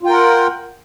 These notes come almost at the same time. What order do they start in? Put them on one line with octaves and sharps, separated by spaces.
F4 G5 A#4 F#5